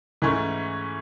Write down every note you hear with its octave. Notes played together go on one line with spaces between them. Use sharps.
G#2 E3 A3 C#4